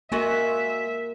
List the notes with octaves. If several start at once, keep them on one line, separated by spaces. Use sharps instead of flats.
G#3 A#3 F#4 A#4 E5 G#5